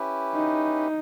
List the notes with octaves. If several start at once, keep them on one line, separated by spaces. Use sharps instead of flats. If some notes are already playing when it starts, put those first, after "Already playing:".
Already playing: C#4 E4 G4 B4
D#4